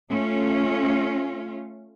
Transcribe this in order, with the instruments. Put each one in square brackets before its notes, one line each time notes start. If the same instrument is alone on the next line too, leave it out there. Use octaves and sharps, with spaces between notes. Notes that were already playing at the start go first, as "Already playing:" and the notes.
[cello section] A3 C#4 F4